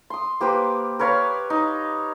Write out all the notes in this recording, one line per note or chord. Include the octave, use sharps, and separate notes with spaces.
C6 D#6
A#3 G4 B4 C5
A#4 B4 C#5 F5
D#4